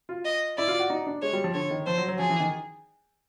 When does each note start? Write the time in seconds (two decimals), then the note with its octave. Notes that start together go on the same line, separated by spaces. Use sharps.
0.09 F4
0.25 D#5
0.58 E4 D5
0.68 F4
0.80 F#4
0.90 D#4
1.07 D4
1.22 G#3 C#5
1.33 G3
1.44 F3
1.54 D3 C#5
1.71 D#3
1.87 F3 C5
1.98 F#3
2.08 F#3
2.19 F3 G#4
2.30 E3
2.40 D#3